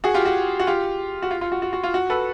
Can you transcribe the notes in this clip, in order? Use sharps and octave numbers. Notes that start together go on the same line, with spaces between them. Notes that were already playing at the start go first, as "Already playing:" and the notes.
F#4 G#4
F4 G4
F#4
F#4
F4 G4
F#4
F4
F4
F#4
F#4
F#4
F4
F#4
A4 B4